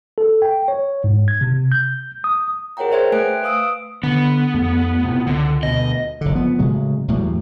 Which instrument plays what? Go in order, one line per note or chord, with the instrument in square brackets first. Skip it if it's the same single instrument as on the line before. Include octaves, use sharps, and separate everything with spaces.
[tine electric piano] A4
G5
C#5
G#2
G#6
C3
G6
D#6
[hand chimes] G#4 A#4 C#5 F#5 G5 A#5
C5 D5 E5 G5 C6 G#6
A3 B4 G#5 F#6 D7
B4 F5 D#6 E6 D7
[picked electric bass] D3 [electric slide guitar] B3
[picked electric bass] F2 A3
A2 C3
[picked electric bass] C#2 [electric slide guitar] D3
[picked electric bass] D2 B2 [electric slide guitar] D#5
[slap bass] F#1 D3
F3 B3
A2 C#3 F#3 G#3
E2 A2 F#3 G3